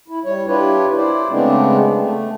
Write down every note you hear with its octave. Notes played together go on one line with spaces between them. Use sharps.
E4
G3 C#5
D4 E4 F4 G4 B4 C#5
E4 C5 D5
C#3 G#3 A3 B3 C4 D4
A3